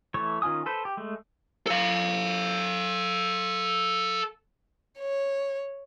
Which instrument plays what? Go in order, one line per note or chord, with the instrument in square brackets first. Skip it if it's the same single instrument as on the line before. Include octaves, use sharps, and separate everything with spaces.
[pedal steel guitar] E3 A3 C#5 C#6
D#3 C#4 F4 G#5 D#6
A4 B4 C5
G4
G#3 A3
[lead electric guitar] A4 F5
[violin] C#5